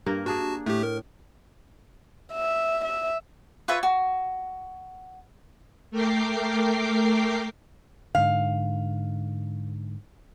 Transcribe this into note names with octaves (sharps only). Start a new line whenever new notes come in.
G2 A#3 A#4
D4 F#4 G#4 A5
A2 A3 G4
A#4
E5
E5
F4 B4 C#5 E5
F#4
A3 A#4 G5 D6 C7
G#2 D3 F5